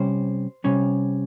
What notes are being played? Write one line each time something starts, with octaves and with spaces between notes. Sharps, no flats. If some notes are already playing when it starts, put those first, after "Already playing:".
Already playing: C3 G3 C#4 C5
C3 G3 C#4